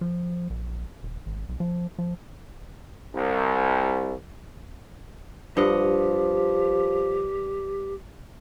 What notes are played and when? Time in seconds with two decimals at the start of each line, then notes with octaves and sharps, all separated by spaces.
0.01 F3
0.50 A#1
1.03 D#1
1.26 G#1
1.49 B1
1.60 F3
1.99 F3
3.15 C2
5.57 G2 F3 G4 D#5 F#5